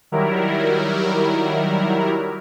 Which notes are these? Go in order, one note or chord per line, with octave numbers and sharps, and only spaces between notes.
D#3 F#3 G3 E4 A#4